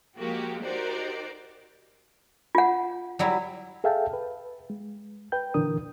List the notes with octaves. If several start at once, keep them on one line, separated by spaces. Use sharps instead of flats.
F3 G#3 A#3 F#4 G4
D#4 F#4 G4 A#4 C5 D5
F4 F#5
F#3 G3 E4
G#4 A4 E5 F5 G5 A5
B4
G#3
B4 G5 G6
A#2 D3 E3 D4 A#4 D#6